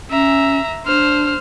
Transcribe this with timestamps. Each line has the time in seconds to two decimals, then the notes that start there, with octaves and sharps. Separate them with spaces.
0.10 C#4 E5 A#5
0.86 D4 C5 F6